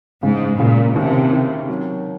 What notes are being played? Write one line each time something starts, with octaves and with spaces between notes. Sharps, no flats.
G#2 C#3
A#2 C#3
D#2 C3
D#3
F#3